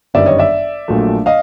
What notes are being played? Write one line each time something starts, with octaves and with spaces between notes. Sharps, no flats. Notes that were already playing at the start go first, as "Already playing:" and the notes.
G1 F#2 D#3 G3 D5 E5
C#5 D#5
D5 E5
A#1 A#2 F#3 A3
D#5 F5